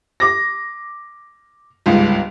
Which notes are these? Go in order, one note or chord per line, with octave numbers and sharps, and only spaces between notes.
D6 A#6
G1 C#2 G#2